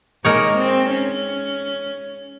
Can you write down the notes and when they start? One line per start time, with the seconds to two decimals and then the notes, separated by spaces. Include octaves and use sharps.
0.24 G#3 A#3 D#4 A#4 C#5
0.57 C4
0.90 C#4